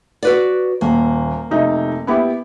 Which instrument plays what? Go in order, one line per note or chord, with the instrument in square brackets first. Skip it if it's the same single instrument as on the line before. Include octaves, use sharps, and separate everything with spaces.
[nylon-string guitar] F#4 B4 D5
[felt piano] D#1 [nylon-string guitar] A#3
[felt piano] F1 D#4 E5
B3 E4 G4